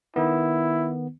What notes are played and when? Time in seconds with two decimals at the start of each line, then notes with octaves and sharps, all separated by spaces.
0.16 D#3 B3 E4